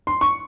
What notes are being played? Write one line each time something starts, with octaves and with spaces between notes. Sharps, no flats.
C6
C#6